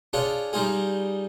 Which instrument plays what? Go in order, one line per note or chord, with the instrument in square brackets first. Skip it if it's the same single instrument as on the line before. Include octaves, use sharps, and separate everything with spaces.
[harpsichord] D4 F4 G#4 C#5
G3 D#4 F4 G#4